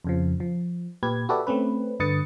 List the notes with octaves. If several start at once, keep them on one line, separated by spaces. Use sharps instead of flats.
F2 C#3 F3
F3
A#2 G4 B4 G#6
F#4 G4 A4 B4 D5 E5
A3 C4 C#4 B4
G2 D3 B4 D#6 A6 C#7